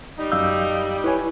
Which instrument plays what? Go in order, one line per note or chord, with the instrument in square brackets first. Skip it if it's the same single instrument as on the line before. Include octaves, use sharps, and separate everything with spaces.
[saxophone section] G3 [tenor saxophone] D#4
[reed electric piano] F#2 F5 G6 [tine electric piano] E6
[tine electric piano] E4 [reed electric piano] B4 C#5 G#5